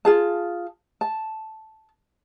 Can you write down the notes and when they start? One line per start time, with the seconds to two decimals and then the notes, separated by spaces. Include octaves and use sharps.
0.05 F4 G#4 A5
1.01 A5